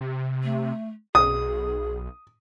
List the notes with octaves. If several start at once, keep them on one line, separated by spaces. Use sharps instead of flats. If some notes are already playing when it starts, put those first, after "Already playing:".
C3
A3
B1 G#4 D#6